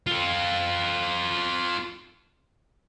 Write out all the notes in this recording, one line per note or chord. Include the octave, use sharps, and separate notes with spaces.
F4 A4